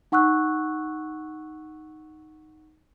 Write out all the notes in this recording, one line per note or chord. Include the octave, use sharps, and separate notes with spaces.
D#4 F#5 C#6 E6 F#6